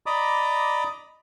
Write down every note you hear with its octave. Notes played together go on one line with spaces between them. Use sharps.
D5 D#5 A#5 B5 D6 D#6